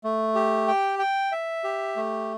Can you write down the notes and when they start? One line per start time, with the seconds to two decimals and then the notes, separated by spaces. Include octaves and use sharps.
0.04 A3
0.35 G4
0.68 G5
0.99 G5
1.32 E5
1.64 G4
1.96 A3